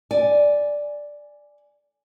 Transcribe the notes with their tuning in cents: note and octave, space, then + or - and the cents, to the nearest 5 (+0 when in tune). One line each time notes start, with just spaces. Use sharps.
D5 +0 G#5 +0